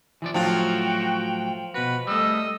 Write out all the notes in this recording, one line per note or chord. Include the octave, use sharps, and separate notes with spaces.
E3 F3 D5
A2 F3 F#3 F4 F#4 G5
B2 F#4 B4
G3 A3 D#5 E6